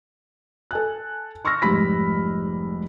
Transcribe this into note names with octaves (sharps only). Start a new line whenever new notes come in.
A4 G#5 F#6
C6 C#6 E6 F6 A#6
F1 G#2 G3 B5 B6